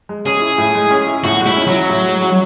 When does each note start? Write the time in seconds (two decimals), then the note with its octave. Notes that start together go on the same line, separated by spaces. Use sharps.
0.09 G#3
0.26 C#4 G#4
0.41 E4
0.58 A2
0.75 G#3
0.91 C#4
1.07 E4
1.24 A2 F#4
1.41 G#3
1.46 E4
1.56 C#4
1.67 F#3
1.73 E4
1.89 A2
2.06 G#3
2.21 C#4